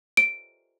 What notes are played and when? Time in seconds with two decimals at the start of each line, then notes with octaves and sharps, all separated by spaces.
0.17 D7